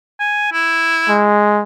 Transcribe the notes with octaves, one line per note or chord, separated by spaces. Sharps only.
G#5
E4
G#3